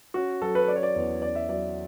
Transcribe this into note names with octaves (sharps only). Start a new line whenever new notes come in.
C#4 F#4
F#3 A4
B4
C#4 D5
C#5
D5
E2
C#4 D5
E5
F#3 D5